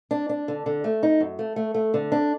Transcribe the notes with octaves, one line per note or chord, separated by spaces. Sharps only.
D4
D4
D3
D3
A3
D#4
F#2
A3
A3
A3
D3
D4